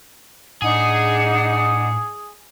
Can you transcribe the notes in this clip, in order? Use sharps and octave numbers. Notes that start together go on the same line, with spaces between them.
A2 D4 D#4 G#4 F#5